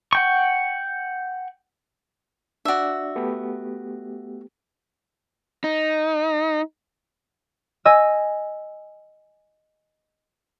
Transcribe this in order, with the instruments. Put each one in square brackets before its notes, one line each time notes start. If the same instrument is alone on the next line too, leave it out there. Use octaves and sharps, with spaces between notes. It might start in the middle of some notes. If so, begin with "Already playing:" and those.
[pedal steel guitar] F#5 G5 C#6
[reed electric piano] D4 D5 [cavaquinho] F#4 E5
[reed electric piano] A3 B3 G4
[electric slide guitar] D#4
[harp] D#5 G#5 E6